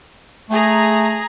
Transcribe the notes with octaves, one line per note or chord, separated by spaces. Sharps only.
A3 G#4 A#5